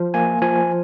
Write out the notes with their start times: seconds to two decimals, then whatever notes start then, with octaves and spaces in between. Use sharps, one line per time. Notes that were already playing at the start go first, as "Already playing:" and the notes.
Already playing: F3
0.14 A#3 G#5
0.42 F3 G#5